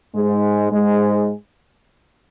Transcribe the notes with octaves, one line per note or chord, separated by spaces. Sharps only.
G#2 G#3
G#2 G#3